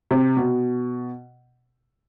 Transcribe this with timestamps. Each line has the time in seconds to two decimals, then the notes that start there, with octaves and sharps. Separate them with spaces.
0.11 C3
0.37 B2